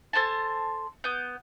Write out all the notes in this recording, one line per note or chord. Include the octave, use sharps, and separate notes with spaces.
A4 C5 G#5 A5
B3 G6